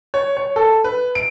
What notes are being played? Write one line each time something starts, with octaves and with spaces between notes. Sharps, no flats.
C#5
C#5
A4
B4
D7